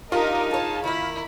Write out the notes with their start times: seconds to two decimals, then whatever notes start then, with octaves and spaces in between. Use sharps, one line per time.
0.12 D4 D#4 F4 G4 A#4 D#5
0.51 G#4 C#5 A5
0.84 D#3 A#3 E4 B5